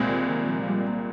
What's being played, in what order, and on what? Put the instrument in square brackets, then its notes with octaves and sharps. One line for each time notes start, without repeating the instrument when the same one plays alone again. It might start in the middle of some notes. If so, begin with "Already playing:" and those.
Already playing: [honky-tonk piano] C2 A#2 G#3 C4
[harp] D#3
D#3
F3
F3
G3
A#3